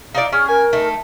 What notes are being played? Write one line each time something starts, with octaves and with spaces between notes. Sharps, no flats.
D#4 E4 D5 F5
C#4 G#4 F6
A#4 G#5
A3 D#4